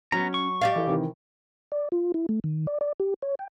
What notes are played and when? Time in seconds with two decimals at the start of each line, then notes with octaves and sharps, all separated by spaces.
0.12 F#3 B3 C#4 A#5
0.34 C#6
0.61 G4 D5 F5
0.75 E3 A4
0.87 C3 D#3 E3
1.72 D5
1.92 F4
2.14 E4
2.29 A3
2.44 D#3
2.67 D5
2.81 D5
3.00 G4
3.22 C#5
3.39 G5